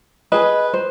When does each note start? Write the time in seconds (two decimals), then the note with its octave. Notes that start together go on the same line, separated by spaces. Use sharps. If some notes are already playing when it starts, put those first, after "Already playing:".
0.32 G#4 B4 D#5
0.74 C5